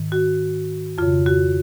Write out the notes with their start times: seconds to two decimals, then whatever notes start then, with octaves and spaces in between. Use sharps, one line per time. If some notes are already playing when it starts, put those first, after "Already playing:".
Already playing: G#2 D#3
0.12 F#4
0.98 F2 C#3 F4
1.26 F#4